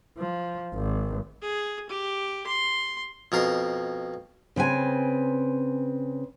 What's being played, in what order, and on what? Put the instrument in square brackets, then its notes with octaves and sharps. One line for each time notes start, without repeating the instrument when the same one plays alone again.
[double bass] F3
G#1
[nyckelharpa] G#4
G4
C6
[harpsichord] F2 B2 A#4 C6
[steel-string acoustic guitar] C#3 C4 B4 G#5